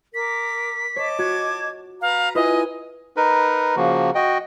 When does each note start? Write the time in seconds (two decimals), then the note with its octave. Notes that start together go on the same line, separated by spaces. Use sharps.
0.14 A#4 D6 B6
0.96 C#5 D#5 A5 D6
1.19 F#4 G#6
2.01 B4 F5 A#5
2.35 E4 F4 B4 D#5 G#5
3.17 D#4 A#4 B4
3.76 C#3 F3 A#3 F#4
4.15 F#4 D#5 G5